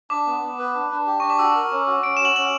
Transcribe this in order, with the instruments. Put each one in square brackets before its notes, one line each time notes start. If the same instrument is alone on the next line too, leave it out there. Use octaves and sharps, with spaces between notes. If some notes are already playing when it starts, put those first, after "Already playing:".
[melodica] D4 [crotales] D6
[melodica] B3
B3
B4
D4
D4
G4
[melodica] D4 [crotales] C#6
[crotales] D6
[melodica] F#4 [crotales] E6
[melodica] A#4
C#4
F#4
[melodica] C#4 [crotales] D7
[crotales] E7
[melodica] F#4
[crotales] F#7
[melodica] C#4 [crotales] F#7